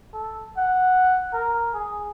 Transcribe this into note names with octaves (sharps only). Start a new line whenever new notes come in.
A4
F#5
A#4
G#4